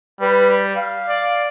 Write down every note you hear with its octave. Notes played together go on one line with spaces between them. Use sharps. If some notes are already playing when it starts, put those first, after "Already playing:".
G3 B4
F5
D5